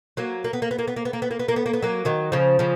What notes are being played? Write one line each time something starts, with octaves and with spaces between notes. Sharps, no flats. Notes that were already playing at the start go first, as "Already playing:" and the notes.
F#3 A#3
A#3
B3
A#3
B3
A#3
B3
A#3
B3
A#3
B3
A#3
B3
A#3
B3
A#3
B3
F#3 A#3
D#3 F#3
C#3 F3
C#3 F3